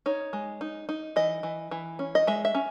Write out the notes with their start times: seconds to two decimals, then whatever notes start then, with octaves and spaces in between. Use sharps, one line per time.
0.06 D#4 C#5
0.33 G#3
0.61 D#4
0.89 D#4
1.16 E3 D#5
1.43 E3
1.71 E3
1.99 C#4
2.15 D#5
2.27 G#3 E5
2.45 E5
2.55 C#4